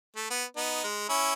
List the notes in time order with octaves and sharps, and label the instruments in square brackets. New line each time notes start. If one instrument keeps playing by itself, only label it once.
[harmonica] A3
B3
B3 D#4
G#3
C#4 E4